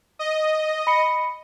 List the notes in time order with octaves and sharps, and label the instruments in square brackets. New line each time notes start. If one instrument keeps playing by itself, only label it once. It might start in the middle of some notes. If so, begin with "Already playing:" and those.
[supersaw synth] D#5
[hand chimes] B5 C#7